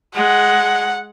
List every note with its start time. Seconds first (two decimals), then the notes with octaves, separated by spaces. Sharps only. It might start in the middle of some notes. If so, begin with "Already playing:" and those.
0.15 G#3 F#5